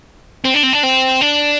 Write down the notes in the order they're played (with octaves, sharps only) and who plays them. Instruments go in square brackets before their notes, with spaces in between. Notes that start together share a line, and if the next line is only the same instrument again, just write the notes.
[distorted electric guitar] C4
D4
C4
D4
C4
D4